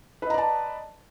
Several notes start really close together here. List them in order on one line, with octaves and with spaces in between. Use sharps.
B4 D#5 A#5 D5 A5